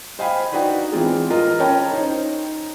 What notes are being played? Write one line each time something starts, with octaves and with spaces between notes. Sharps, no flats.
C5 D#5 F5 G5 G#5 B5
D4 D#4 F#4 B4 D5 G5
E3 G#3 C4 F4 G#4
F4 A#4 D#5
C#4 A#4 C#5 G5 A5 A#5
D#4 C5